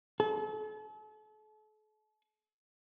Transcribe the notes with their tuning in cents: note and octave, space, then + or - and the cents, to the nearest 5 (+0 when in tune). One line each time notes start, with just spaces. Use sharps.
A4 -40